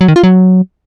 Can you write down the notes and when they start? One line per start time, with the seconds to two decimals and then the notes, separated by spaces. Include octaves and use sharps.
0.01 F#3
0.08 D#3
0.16 F4
0.23 F#3